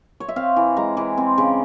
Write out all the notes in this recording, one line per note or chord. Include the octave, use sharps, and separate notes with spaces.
C#5
E5
C4 F5
E3
G#3 A#5
E3
C4
C#3